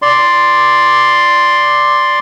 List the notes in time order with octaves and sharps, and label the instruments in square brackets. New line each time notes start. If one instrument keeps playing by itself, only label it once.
[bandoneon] D5 C6